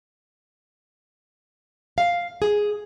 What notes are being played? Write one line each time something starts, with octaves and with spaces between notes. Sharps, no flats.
F5
G#4